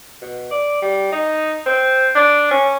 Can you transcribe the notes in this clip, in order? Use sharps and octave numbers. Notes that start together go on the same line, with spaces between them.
B2
D5
G3
D#4
C4
D4
C#4